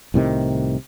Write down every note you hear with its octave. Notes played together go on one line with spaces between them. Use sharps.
C2 A2 C3 D#3